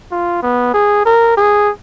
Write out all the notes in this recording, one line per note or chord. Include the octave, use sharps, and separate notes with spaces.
F4
B3
G#4
A#4
G#4